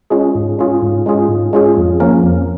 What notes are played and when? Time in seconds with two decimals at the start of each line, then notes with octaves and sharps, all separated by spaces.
0.10 G#3 C#4 F4 G#4
0.35 G#2
0.58 G#3 C#4 F4 G#4
0.82 G#2
1.06 G#3 C#4 F4 G#4
1.29 G#2
1.53 G#3 C#4 F4 G#4
1.77 F2
2.00 F3 A#3 C#4 A#4
2.24 F2